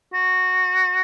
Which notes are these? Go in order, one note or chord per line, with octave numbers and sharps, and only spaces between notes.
F#4